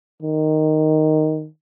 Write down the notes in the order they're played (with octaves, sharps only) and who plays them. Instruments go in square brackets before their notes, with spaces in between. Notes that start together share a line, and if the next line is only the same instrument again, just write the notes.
[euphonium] D#3